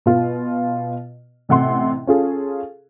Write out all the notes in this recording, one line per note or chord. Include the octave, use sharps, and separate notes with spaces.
B2 F4
A1 C3 F#5 C6
C#4 F4 G#4 A4